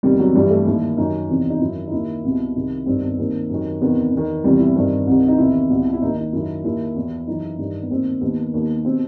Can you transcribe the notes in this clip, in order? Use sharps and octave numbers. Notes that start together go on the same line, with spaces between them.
E2 C3 D#3 G3
F#3
G2 E3 G3
A3
D#2 D#3 E4
F#2 D#3 D#4
E2 C3 E3
D#4
F#2 D#3 E4
D#4
D#2 D#3 E4
C2 B2
C2 C3 D#3
G2 D#3 C4
B3
D#2 D#3 C4
F#2 D#3
E2 C3 D#3 B3
E2 D#3
E2 C3 E3 G3
E4
G2 D#3 C4
C2 C3 D#3
D#4
E2 C3 D#3 E4
C2 B2
E4
D#2 D#3 D#4
D#4
F#2 D#3 E4
D#2 D#3 E4
E2 B2
F#2 E3 D#4
G2 D#3
B3
D#2 D#3 C4
D#2 D#3 B3
D#2 D#3
B2 C4